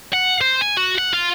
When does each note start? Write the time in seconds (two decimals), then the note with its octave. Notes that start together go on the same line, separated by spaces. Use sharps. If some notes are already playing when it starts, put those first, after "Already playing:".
0.13 F#5
0.41 C5
0.61 G#5
0.77 F#4
0.98 F#5
1.13 F4